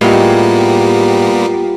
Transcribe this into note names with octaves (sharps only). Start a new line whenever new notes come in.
A2 G3 G#3 A#3 B3 F4 G4 G5